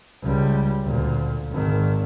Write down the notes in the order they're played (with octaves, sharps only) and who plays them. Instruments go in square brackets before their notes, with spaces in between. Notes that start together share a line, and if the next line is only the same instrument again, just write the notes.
[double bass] C#2 G3
D2 A#2
G#1 D#3